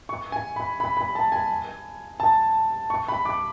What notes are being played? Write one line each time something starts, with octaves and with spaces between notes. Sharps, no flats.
C#6
G#5
B5
B5
B5
A5
G#5
A5
C#6
B5
D6